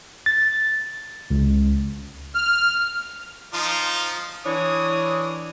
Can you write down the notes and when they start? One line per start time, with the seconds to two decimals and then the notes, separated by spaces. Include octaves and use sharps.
0.26 A6
1.31 C#2
2.35 F6
3.54 F3 D#4 F4
4.46 E3 D4 C#5 D#6